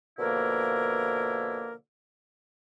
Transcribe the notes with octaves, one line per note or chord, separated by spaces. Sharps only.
B2 D3 F3 A#3 E4 A#4